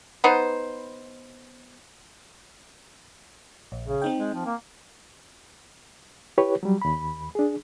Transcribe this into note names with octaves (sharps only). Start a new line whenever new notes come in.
B3 D#4 B4 C5
A#1
C#3
C4 D#4 G5
G#3
F3
A#3
E4 G4 B4 C#5
F#3 G3
D#2 B5
D4 G#4